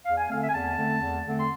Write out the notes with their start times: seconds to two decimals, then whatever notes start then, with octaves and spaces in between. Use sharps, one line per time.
0.06 E2 F5
0.18 G#5
0.29 D3 A3 C4 F5
0.41 E5
0.49 G#5
0.54 E2 A5
0.77 D3 A3 C4
1.01 E2
1.25 D3 A3 C4
1.37 C6